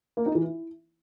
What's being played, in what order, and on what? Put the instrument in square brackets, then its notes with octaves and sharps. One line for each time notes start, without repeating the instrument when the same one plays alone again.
[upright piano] A#3
D#4
E3
E4